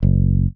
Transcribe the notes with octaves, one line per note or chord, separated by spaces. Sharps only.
F#1